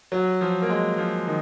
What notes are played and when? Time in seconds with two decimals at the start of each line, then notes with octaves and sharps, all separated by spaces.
0.12 F#3
0.41 F3
0.62 A#3
0.70 G#3
0.98 F3
1.27 D#3